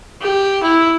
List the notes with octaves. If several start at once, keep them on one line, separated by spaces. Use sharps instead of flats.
G4
E4